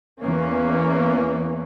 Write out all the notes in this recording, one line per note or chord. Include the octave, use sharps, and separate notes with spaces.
E2 E3 A#3 C#4